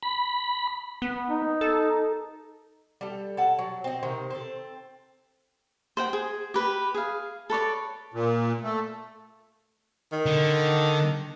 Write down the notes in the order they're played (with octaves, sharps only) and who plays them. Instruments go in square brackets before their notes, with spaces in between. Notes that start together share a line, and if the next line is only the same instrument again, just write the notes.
[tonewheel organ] B5
[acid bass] B3
[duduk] D#4
[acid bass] A4
[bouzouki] G3 A4
A4 F#5 A5
F#3
C4 D#5
C3 D#3 C5
C4 A4
[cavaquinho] C5 F#5 G5
G#4
G4 B4 B5
G#4 F5
A4 B4 C#5 D5
[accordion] A#2
A3
[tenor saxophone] D#3
[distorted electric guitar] D3